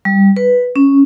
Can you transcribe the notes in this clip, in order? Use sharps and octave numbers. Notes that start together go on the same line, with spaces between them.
G3
B4
C#4